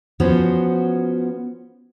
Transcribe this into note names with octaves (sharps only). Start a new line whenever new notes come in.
F3 B3 C#4 F#4 C5